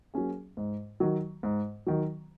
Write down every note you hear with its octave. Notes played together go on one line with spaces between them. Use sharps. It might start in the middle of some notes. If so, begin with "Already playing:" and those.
F#3 A#3 C#4 G#4
G#2
D#3 F#3
G#2
D#3 F#3